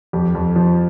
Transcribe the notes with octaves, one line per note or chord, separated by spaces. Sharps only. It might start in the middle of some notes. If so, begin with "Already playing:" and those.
F2 G4
F2
F3